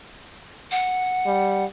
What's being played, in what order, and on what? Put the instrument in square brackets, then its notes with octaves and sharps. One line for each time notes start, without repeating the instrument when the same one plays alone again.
[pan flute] F#5
[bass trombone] G3